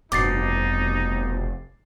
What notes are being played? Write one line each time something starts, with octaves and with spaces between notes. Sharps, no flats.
F1 G2 B2 D#4 D6 A6 C7